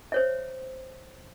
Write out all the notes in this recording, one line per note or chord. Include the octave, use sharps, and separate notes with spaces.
C5 C#5 E5